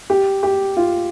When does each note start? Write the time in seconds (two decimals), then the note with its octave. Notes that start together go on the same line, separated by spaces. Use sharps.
0.10 G4
0.43 G4
0.77 F4